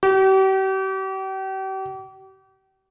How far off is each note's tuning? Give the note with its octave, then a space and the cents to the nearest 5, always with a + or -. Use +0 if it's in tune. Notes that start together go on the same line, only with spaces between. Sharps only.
G4 -40